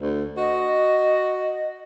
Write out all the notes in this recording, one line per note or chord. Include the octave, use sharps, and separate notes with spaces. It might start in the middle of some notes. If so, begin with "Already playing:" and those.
D2
F#4 D#5